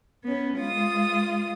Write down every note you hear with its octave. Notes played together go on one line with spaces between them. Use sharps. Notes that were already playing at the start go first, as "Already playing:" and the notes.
B3 C#4
G#3 F4 D#6